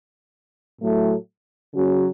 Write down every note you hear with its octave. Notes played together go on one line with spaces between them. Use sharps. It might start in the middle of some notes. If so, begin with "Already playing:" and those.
A2 F#3 A3
C#3 F#3 C#4 F#4